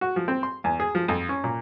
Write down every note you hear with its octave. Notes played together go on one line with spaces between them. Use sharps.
F#4
F3
C4
C6
E2
G#4
F3
F2
C#4
A#2